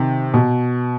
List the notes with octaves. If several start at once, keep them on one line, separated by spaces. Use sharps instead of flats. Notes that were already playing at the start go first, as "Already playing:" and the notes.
Already playing: C3 D#3
B2